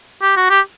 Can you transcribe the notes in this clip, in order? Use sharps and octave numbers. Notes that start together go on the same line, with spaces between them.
G4
F#4
G4